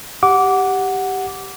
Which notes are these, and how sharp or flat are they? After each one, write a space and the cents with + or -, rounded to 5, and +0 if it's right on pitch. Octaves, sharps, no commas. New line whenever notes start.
G4 +0 F#5 +0 D6 -15